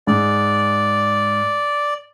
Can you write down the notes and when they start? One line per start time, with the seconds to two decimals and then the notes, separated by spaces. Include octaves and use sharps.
0.07 G#2 D5